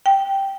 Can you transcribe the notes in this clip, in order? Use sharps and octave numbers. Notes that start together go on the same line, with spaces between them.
G5